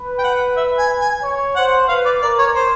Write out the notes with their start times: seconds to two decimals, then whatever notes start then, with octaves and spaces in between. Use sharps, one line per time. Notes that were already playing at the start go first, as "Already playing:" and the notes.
Already playing: B4
0.19 G5
0.24 F#5
0.57 E5
0.79 G#5
1.01 G#5
1.23 C#5
1.56 C5 F#5
1.88 B4 F5
2.05 D5
2.22 A#4 D5
2.39 C#5
2.55 C5